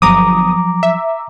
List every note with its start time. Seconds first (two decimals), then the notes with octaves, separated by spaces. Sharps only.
0.02 G1 F3 F#3 A#5 D6 D#6
0.83 E5